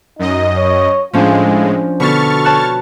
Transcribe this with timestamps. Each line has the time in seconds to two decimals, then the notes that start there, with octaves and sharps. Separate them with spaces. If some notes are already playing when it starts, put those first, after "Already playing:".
0.19 F#2 D#4 D#5
0.56 C#5
1.13 A2 F3 G#3 C#4 D4 F4
2.00 B2 D3 A4 C#6 F6 A6
2.45 C#5 A5 F#6